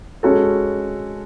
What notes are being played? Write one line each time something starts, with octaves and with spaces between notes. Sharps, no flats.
G#3 C#4 F#4 A4